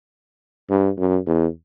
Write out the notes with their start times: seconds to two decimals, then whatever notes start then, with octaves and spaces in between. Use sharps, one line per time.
0.70 G2
0.98 F#2
1.26 E2